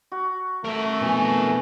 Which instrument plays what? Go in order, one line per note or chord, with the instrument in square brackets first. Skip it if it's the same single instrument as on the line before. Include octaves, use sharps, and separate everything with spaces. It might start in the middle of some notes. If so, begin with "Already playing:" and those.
[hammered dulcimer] F#4
[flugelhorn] A3 [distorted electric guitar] A#4 E5
[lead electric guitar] F2 B2 [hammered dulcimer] E3 G#4